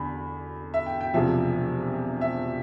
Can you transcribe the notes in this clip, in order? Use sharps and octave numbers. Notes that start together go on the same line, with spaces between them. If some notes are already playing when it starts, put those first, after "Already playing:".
Already playing: E2 D3 B5
E5
G5
G5
E1 E2 C3 F3 E5
E5